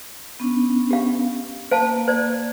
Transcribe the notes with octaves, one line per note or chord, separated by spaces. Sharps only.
B3 C#4 D4
G4 F5
A#3 C5 F5 A5
C5 D5